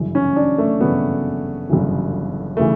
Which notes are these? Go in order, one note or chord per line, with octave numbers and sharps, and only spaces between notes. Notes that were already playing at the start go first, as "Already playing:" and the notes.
Already playing: G1 F#2 C#3 E3
C#4
D4
A3
G1 F#2 C#3 E3 B3
G1 F#2 C#3 E3
C#3 E3 A3